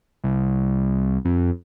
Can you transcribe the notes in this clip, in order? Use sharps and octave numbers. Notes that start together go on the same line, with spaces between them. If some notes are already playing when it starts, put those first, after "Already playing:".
C2
F2